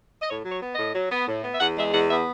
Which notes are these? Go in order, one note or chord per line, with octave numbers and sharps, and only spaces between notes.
D#5
A2 C#5
F#3
C#5
B3
D#5
A2
F#3
B3
A2
B3
E5
E2 F#5
G#3 E5
E2 F#5
B3 E5